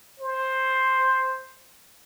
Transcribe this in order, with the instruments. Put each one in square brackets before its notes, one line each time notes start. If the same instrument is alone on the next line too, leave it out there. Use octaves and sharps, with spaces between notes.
[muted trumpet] C5